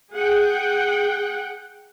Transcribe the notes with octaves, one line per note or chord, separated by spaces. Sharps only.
G#4 F#5 G5